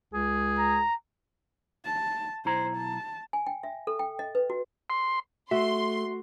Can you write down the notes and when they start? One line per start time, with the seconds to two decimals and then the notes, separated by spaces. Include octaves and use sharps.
0.14 C#2 G#4
0.59 A#5
1.85 A5
2.45 B1 E4 C5 A#5
2.77 A5
3.33 G#5
3.47 G5
3.63 E5
3.87 A4
3.99 G5
4.19 D#5
4.35 B4
4.50 F#4
4.90 C6
5.51 A3 F#4 E5 C6